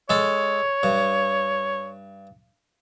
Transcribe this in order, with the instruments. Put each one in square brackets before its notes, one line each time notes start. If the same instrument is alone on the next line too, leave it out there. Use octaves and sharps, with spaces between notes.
[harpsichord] G#3 A4 [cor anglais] C#5
[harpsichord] G2